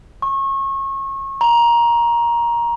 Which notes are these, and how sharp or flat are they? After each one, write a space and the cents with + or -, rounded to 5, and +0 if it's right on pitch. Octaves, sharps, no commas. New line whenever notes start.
C#6 -30
A#5 +15